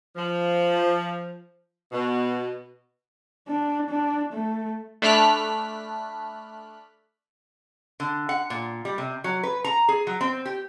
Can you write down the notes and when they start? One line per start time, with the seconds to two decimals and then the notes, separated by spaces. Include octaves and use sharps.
0.16 F3
1.92 B2
3.48 D4
3.89 D4
4.33 A3
5.02 A3 D4 B5 F6 F#6 B6
8.00 D3
8.29 F#5
8.50 A#2
8.85 G3
8.98 C3
9.24 F#3
9.43 B4
9.64 A#5
9.88 G#4
10.07 F#3
10.21 C4
10.45 G4